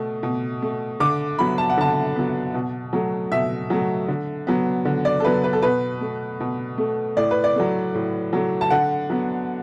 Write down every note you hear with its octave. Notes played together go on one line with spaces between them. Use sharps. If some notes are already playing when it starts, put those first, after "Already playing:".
Already playing: B2 A3
B2
A3
D3 D6
F#3 B3 B5
A5
F#5
D3 A5
F#3 B3
B2
F#3 A3
B2 E5
F#3 A3
D3
F#3 B3
D3
D5
A4
F#3 B3 B4
B4
A4
B2 B4
A3
B2
A3
A2 D5
B4
D5
F#3 A3
A2
F#3 A3
A5
D3 F#5
F#3 B3